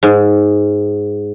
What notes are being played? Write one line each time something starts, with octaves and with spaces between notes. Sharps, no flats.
G#2